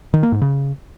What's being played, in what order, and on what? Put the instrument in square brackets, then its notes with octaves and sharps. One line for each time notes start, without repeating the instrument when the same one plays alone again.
[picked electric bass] D#3
A#3
G#2
C#3